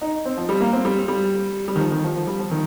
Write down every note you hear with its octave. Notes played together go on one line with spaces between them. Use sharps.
D#4
C4
F3
G3
A#3
C4
G3
G3
G3
D#3
F3
D#3
F3
F3
G3
F3
D#3